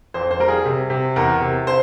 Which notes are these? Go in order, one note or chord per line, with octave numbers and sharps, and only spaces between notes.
F2 C5
C5
G3 A#4
G#4
C3
C3
E2 A#4
C3
C5